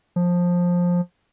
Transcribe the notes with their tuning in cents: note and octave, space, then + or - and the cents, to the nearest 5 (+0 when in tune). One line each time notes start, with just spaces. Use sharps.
F3 +15